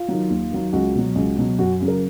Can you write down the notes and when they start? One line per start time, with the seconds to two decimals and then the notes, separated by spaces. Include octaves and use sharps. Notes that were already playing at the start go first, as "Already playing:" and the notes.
Already playing: F4
0.08 D#3 F#3
0.30 D#2
0.52 D#3 F#3
0.73 C#2 F#4
0.95 B2 F#3
1.15 C#2
1.37 B2 F#3
1.58 F#2 F#4
1.81 C#3 F#3
1.88 A#4